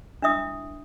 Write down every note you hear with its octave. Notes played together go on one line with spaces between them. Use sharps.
D4 E4 E5 D#6